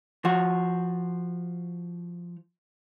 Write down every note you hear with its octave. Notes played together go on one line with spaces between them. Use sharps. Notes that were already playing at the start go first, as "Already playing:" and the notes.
F3 F#4